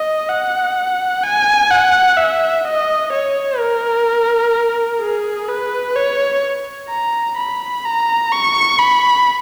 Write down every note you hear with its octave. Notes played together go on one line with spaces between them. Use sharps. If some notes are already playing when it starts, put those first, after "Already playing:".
Already playing: D#5
F#5
G#5
F#5
E5
D#5
C#5
A#4
G#4
B4
C#5
A#5
B5
A#5
C#6
B5